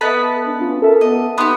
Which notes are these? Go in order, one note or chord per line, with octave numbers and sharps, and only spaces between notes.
B3 A4 B4 D#5 E5 A5 B5
D4
C#4 F4
A4 A#4 E5 A5
B3 D#5
B3 D#4 G4 B5 C6